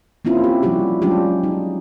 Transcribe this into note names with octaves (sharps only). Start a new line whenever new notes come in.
A#3 C4 C#4 E4 F4
G4
F3 G3 E4 F#4 G4
F#3 G#3 C#4 D4 F4 G4
D#4